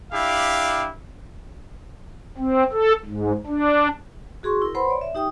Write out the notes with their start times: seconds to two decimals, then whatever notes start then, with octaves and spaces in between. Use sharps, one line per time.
0.12 D4 E4 G4 F5
2.38 C4
2.72 A4
3.05 G#2
3.47 D4
4.43 F#4 G#4 C6 C#6
4.62 E4 A#4
4.75 B4 C5 F#5 A5 B5 C6
4.88 C#5 D5
5.01 E5
5.15 D#4 G4 G5 D#6